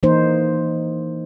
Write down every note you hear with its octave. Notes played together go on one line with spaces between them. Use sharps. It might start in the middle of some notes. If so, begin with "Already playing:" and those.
E3 A#3 D#4 C5